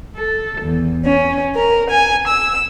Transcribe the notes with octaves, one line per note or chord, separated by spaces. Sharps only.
A4
E2
C#4
A#4
G#5
E6